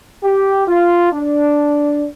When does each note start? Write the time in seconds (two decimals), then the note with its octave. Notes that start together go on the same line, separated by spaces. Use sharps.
0.23 G4
0.67 F4
1.12 D4